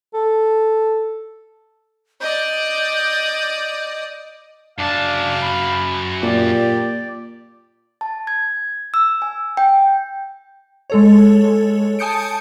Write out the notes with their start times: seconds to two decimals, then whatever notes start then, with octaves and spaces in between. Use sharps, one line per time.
0.14 A4
2.21 D5 D#5 G6
4.78 F#2 D4 F5 A5
5.42 B5
6.23 A#2 G4 D5
8.01 A5
8.27 G#6
8.94 E6
9.22 G#5
9.57 G5
10.90 G#3 A4 C#5
11.99 G#5 A5 D#6 G6 C#7 D7